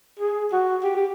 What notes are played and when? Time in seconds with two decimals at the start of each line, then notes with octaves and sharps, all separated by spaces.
0.20 G#4
0.52 F#4
0.84 G4
0.96 G4